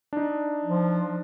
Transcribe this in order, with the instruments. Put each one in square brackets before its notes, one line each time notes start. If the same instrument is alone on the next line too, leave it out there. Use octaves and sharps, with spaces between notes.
[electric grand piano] D4 D#4
[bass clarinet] F3